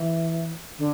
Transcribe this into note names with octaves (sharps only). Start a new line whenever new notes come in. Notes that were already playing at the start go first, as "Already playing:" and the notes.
Already playing: E3
D3